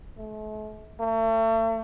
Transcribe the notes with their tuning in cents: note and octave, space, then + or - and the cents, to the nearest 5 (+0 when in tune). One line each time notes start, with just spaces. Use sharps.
A3 -40
A3 +40